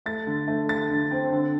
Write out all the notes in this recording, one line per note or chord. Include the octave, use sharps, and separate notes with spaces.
A3 A6
D3
A3
D3 A6
D3
C4
D3